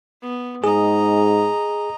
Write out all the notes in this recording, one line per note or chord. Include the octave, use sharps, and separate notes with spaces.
B3
G#2 G#4 D#5 A#5